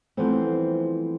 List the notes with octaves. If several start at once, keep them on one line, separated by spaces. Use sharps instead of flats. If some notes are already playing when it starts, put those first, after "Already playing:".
E3 F3 G3 A3 B3 C4